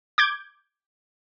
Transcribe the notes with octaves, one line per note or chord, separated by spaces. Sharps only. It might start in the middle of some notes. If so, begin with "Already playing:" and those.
D6 G6 G#6